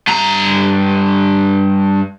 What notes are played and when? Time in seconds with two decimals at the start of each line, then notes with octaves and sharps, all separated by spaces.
0.07 G2 A#5